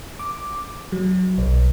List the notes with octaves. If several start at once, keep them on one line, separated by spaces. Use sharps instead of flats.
D6
F#3
B1